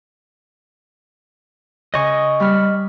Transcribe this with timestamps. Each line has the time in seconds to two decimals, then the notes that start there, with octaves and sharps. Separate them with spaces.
1.94 C#3 D#5 G#5 C#6
2.40 G3 B5 F6